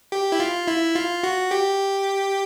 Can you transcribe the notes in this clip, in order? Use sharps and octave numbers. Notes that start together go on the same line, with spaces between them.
G4
E4
F4
E4
F4
F#4
G4